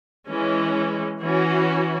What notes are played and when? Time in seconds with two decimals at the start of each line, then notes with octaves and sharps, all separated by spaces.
0.29 E3 G#3 C#4
1.22 E3 C#4 F#4